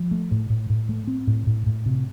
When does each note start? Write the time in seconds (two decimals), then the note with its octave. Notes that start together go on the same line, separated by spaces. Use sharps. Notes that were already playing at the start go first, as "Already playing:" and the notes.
Already playing: F3
0.11 A3
0.31 A2
0.50 A2
0.70 A2
0.89 A3
1.07 C4
1.27 A2
1.47 A2
1.66 A2
1.86 C3